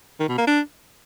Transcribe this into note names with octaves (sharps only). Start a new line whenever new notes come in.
D#3
B2
A#3
D4